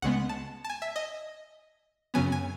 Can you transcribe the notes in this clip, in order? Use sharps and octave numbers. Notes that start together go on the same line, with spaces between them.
C#2 C#3 G#3 B3 F#5
A5
A5
G#5
E5
D#5
F#2 C#3 F#3 B3 G#5
G#5